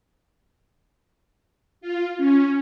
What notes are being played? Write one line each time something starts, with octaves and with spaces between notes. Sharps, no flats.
F4
C#4